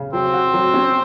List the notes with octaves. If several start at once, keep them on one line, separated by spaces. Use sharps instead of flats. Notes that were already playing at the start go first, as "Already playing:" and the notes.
Already playing: C#3
F#3 C4
F#4
F#3
C#4